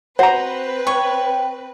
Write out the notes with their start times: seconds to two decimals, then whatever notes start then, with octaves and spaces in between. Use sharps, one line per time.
0.19 C4 F#4 B4 C5 A#5
0.87 C#5 G5 C#6